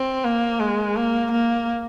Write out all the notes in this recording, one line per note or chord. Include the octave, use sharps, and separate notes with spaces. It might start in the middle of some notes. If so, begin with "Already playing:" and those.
Already playing: C4
A#3
G#3
A#3
A#3